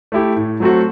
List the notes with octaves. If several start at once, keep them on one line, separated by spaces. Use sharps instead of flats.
A3 E4 G4
A2
F#3 A3 C4 F#4